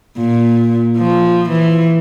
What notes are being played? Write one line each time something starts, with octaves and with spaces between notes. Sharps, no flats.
A#2
F3
E3